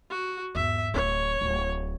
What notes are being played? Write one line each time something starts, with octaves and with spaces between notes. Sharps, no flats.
F#4
E2 G#2 E5
D1 C4 C#5
D1 E4